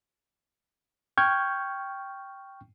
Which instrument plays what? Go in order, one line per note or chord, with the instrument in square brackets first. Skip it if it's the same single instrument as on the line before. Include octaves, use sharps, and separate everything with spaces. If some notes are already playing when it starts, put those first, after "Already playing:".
[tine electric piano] G5 C#6 F6 G6 G#6